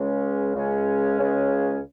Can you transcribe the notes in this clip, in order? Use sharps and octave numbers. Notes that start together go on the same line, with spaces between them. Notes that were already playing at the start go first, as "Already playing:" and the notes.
Already playing: C#2 C#3 G#3 C#4
C#2 C#3 G#3 C#4
C#2 C#3 G#3 C#4